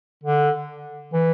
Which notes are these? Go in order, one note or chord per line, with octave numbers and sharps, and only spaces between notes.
D3
E3